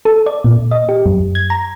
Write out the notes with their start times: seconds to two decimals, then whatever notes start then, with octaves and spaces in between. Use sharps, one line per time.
0.05 A4
0.26 D5
0.44 A#2
0.71 D#5
0.89 G4
1.06 F#2
1.35 G#6
1.50 A#5